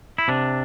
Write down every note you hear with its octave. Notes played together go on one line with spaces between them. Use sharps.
E4
C3 D4